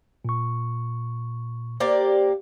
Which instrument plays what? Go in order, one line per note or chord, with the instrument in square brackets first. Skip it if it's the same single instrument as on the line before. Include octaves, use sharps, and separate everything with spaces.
[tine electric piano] A#2 C#6
[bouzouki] A#3 G4 D5 [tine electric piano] C5